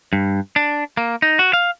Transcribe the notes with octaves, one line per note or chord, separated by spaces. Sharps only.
G2
D4
A#3
D#4
F#4
F5